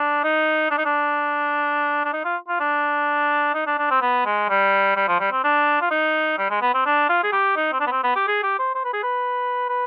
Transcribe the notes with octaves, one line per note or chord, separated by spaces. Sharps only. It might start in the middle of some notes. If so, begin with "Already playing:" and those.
Already playing: D4
D#4
D4
D#4
D4
D4
D#4
F4
F4
D4
D#4
D4
D4
C4
B3
G#3
G3
G3
F3
G3
C4
D4
F4
D#4
G3
G#3
B3
C4
D4
F4
G#4
G4
D#4
C4
D4
B3
C4
B3
G4
G#4
G4
C5
C5
B4
G#4
B4
B4